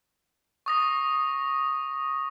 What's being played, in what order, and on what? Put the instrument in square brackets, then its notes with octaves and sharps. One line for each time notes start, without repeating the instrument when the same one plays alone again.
[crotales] C#6 D#6 A#6